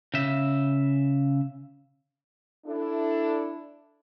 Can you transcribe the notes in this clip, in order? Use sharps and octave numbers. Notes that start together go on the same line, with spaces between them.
C#3 E5
D4 E4 A4